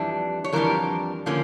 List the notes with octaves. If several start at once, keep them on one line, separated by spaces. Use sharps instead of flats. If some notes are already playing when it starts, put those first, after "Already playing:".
Already playing: F2 E3 G3 D4
C#5
F2 E3 G3 D4 A#4
D3 F3 A#3 C#4